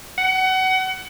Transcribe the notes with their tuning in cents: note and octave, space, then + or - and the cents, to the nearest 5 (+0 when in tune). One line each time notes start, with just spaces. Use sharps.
F#5 +25